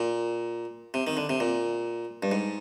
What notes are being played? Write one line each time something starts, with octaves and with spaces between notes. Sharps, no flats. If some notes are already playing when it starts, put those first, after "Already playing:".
Already playing: A#2
C3
D#3
D3
C3
A#2
G2
G#2